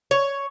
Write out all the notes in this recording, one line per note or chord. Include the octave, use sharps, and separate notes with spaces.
C#5